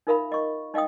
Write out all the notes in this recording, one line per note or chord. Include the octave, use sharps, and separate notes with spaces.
D#4 F4 A#4 E5 F5 B5
D#5 C#6
D#4 D#5 F5 G5 D#6